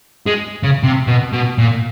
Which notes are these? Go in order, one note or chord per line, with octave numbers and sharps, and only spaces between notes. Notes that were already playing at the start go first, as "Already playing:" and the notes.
G#3
C#3
C3
B2
B2
A#2